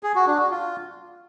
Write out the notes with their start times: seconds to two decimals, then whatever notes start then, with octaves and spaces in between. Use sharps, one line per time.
0.03 G#4
0.15 F#4
0.27 D4
0.39 F#4
0.51 F4